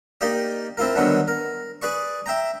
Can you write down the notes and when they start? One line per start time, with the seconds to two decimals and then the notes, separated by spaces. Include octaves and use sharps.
0.21 A#3 D#4 G4 D5
0.77 C4 E4 F4 A#4
0.95 D3 D#3 F#3 G3 B3 D4
1.28 A#4
1.82 G#4 B4 D5 C#6
2.26 E5 G5 A#5